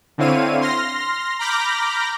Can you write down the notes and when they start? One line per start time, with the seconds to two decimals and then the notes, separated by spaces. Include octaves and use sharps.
0.18 D3 C4 E4 C#5 F5 D#7
0.61 C6 F6 A#6
1.39 A#5 B5 D6 F6 G6 A#6